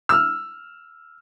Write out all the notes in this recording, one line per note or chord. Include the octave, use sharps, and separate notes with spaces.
E6 F6